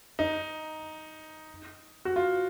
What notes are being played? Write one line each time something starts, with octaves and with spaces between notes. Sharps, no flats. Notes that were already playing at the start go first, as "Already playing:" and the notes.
D#4
F#4
F4